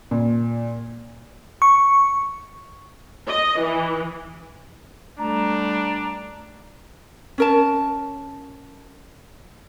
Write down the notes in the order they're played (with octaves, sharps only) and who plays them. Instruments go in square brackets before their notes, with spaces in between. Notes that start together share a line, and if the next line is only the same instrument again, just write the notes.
[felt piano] A#2
[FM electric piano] C#6
[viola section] D#5
E3
[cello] G3 A3 [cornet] D4 [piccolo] A#5
[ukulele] C#4 A#4 A5